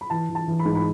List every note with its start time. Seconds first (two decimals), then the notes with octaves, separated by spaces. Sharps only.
0.01 B5
0.10 E3 A5
0.29 E3
0.35 A5
0.48 E3
0.59 B5
0.65 G#2
0.75 B5